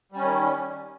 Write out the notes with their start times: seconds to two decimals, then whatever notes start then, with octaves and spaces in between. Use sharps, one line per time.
0.12 G3
0.17 C#4
0.22 D#3